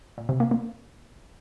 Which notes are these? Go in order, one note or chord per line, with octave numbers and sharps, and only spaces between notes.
A#2
C3
A#3
A#3